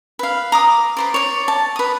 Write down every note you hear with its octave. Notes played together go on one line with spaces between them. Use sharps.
B4 F5
A#5 D6 D#6
B4 C5 D5
C#5 D5
A5
B4 D#6